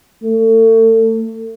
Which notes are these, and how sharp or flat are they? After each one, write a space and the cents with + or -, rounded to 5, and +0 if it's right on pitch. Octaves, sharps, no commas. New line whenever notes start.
A3 +35